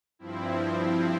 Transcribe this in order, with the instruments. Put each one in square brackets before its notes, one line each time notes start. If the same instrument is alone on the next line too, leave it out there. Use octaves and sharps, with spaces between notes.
[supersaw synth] G2 F3 C4 E4